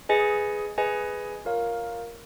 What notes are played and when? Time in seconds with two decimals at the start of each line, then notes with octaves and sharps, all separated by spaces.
0.09 G#4 B4 D#5 G#5
0.78 G#4 B4 D#5 G#5
1.45 F4 A#4 C#5 F5